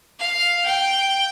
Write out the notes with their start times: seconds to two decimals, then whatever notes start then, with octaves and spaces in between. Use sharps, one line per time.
0.19 F5
0.66 G5